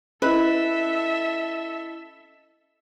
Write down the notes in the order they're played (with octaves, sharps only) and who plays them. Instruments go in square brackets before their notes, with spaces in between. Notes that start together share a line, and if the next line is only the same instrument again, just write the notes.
[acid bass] C#4 [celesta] E4 D#5 B5 [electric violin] A4 E5 [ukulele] B4